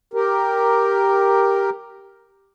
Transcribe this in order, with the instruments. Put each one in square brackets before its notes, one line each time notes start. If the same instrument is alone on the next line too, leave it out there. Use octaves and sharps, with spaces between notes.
[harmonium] G4 A#4